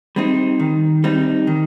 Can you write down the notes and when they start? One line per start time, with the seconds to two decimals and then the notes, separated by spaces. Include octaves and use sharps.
0.16 G3 C4 D#4
0.60 D#3
1.04 G3 C4 D#4
1.47 D#3